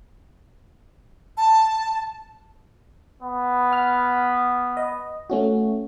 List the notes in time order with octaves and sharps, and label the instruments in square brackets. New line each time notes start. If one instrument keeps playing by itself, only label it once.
[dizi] A5
[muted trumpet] B3
[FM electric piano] F#5 F6
D#5
A3 C#4 F#4